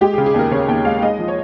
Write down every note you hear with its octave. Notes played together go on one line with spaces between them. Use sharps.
G#3 G4
G#4
C#3
G#4
D#2 A#4
C#3 C#5
D#2 G5
G#3 F5
G#3 D#5
F3
C#5